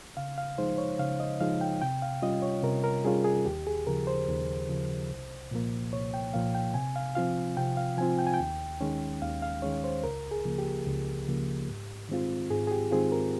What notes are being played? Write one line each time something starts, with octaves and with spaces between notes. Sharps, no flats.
C#3 F5
F5
F3 G#3 D#4 C5
C#5
C#3 F5
D#5
F3 G#3 D#4 F5
G5
C3 G5
F5
G3 C#4 F4 D#5
C#5
C3 A#4
A#4
G3 C#4 F4 G#4
G#4
D#2 G4
G#4
C#3 F3 A#4
C5
D#2
C#3 F3
C2
A#2 F3 A#3
C2 C#5
G5
A#2 F3 A#3 F5
G5
C3 G#5
F5
F3 C4 F4 F5
C3 G5
F5
F3 C4 F4 G#5
G5
G#5
G5
D#2
D#3 G#3 C#4
D#2 F5
F5
D#3 G#3 C#4 C#5
C5
C#2 A#4
G#4
C#3 F3 A#3
G4
C#2
C#3 F3 A#3
G#2
D#3 G#3 C4 F4
G#2 G#4
G#4
G4
D#3 G#3 C4 F4 G#4
A#4